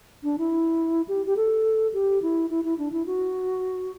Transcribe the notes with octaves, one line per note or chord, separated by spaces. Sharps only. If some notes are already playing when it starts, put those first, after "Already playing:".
D4
E4
G4
G4
A4
G4
E4
E4
E4
D4
E4
F#4